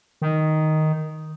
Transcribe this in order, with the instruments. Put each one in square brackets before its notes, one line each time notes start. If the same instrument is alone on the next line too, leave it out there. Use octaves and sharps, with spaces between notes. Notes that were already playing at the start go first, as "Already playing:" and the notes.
[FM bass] D#3